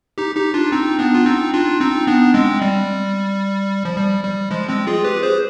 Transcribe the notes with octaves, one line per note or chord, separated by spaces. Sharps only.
D#4 G4
D#4 G4
D4 F4
C4 D#4
B3 D4
F4
C4 D#4
D4 F4
C4 D#4
B3 D4
G#3 C4
G3
F3
G3
G3
F3 G#3
G#3 C4
F4 G#4
G4 B4
G#4 C5